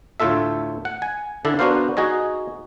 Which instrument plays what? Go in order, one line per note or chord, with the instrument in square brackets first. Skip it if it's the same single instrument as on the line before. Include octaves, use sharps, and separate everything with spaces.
[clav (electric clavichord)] D2 A2 A3 F4 A4 E5
F#5
G#5
D3 D4 E4 A4
B3 D4 F#4 A#4 C5 F5
D#4 F#4 G#4 D#5